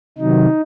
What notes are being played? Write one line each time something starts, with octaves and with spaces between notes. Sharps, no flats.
C3 D#3 F#3 D#4